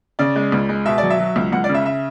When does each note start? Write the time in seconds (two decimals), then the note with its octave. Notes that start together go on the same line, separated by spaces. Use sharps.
0.19 C#3 D5
0.36 G#3
0.52 C#2
0.69 G#3
0.85 B2 E5
0.98 F#3 D5
1.10 E5
1.19 F#3
1.36 C#2
1.52 C#2 F#5
1.64 D5
1.69 C#3
1.74 E5
1.86 E5